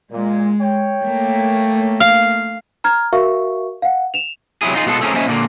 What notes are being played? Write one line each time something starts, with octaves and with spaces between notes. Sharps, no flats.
A#2 G#3
C#5 G5
A3 A#3
F5
A#5 F6 G#6
F#4 A#4 E5 F5 C#6
F5 F#5
E7 F7
C3 F#3 E4 G#4
D#4 F4 G#4
B2 G#3 B3 F4 A4
A3 C4 C#4 G4 G#4 A#4
A#3 C#4 C5 D#5 E5 G#5
A#2 D3 A#3